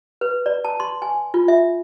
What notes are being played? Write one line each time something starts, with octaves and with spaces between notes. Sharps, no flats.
B4
D5
A5
C6
G#5
F4
E5